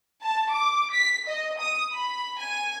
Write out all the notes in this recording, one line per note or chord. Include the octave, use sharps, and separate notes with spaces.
A5
D6
B6
D#5
D#6
B5
G#5